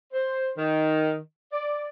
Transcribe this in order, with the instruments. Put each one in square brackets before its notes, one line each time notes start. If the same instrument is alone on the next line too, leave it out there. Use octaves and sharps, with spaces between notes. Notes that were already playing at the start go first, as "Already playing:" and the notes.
[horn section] C5
D#3
D5